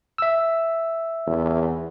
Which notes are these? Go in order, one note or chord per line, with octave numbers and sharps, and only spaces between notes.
E5 E6
E2